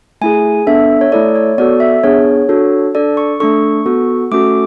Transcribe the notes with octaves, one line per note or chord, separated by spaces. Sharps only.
A3 E4 G#4 G#5
B3 D4 A4 E5
C#5
A3 E4 A4 D5
C#5
B3 F#4 A4 D5
E5
B3 D4 G#4 C#5
D4 F#4 A4
D4 A4 D5
C#6
A3 D4 A4 C#6
B3 F#4 A4
A3 C#4 F#4 A4 D6